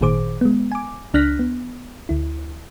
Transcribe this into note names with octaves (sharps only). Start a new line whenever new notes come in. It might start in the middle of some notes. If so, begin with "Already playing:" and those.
G#1 A#2 D#3 G#4 C5 D6
G#3 B3
G#5 D6
C#2 D4 F6 F#6 A#6 B6
B3
D2 E4